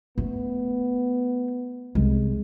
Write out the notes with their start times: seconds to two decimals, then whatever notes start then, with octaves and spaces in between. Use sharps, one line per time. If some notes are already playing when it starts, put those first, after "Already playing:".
0.18 A3 B3
1.95 C2 G#3